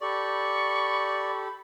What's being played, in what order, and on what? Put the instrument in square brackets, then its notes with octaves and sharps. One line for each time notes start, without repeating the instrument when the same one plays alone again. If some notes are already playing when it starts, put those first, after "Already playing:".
[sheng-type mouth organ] G4 A4 [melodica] D5 [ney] B5 [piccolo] C#6